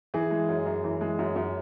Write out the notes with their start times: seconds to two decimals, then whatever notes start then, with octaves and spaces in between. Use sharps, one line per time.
0.14 E3 G#4
0.31 G#3
0.48 F#2
0.66 F#2
0.84 E3
1.01 G#3
1.19 F#2
1.36 F#2